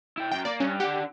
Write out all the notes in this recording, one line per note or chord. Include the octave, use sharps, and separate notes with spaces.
E4 G5
F#2 G5
A#3 D5
G2 C#4
D4 G4 F#5